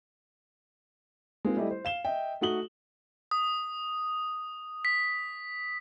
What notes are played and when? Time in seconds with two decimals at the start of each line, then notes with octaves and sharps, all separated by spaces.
1.45 G#3 A#3 C4 D#4 F4
1.57 G3 A3 E4 G4 D#5
1.70 C5
1.85 F5 E7 G7
2.05 D#5 E5 G5
2.41 A3 D#4 F#4 D#6 F#7 G7
3.31 D#6
4.85 B6